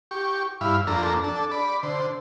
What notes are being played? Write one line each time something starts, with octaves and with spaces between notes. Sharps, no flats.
G4 C#6
G2 E4 F5 B5
F2 A#3 D4 A4 A#5
D4 A4
D5 B5
D3 C5